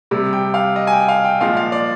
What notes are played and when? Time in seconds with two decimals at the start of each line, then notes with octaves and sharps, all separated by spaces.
0.11 C3 G3
0.33 G5
0.54 F5
0.76 D#5
0.87 G#5
0.92 G5
1.08 F5
1.25 G5
1.41 A#2 F3 G#3 F5
1.57 F5
1.72 D5